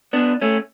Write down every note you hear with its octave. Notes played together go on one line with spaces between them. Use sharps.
B3 D4
A3 C#4